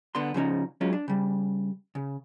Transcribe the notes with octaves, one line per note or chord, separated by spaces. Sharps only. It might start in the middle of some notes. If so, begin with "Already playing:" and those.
D3 B3 C6
C#3 F3 C#4 D#4
F#3 G#3 C#4 F4
D4
C#3 G3
C#3